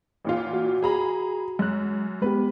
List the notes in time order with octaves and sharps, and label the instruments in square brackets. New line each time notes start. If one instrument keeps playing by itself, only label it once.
[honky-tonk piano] A1 A#2 F4
[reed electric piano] F#4
[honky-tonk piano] G#4 A#5 B5
[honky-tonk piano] F#2 [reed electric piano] G#3 F#6
[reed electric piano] G#3 B3 G4 [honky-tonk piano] B4